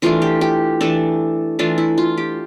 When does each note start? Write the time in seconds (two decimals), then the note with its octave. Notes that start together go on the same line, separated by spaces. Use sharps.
0.02 E3 A3 D4 F4
0.22 G4
0.41 G4
0.81 E3 A3 D4 A4
1.59 E3 A3 D4 F4
1.78 E4
1.98 F4
2.17 G4